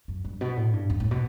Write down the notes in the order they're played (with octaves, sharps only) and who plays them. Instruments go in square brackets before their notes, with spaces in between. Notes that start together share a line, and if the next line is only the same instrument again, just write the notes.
[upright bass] F#2
G2
B2
A2
G2
E2
A2
B2